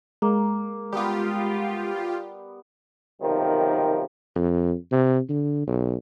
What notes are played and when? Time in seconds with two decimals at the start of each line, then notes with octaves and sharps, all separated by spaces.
0.22 G#3 A#3
0.92 G3 B3 F4 G4
3.21 B1 C3 D#3 F3 G3 A#4
4.36 F2
4.91 C3
5.29 D3
5.67 B1